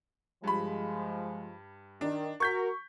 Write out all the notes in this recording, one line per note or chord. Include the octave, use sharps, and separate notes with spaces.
G2 F3 G#3 B5
D#3 D4
F#4 A#4 C#6 G6 B6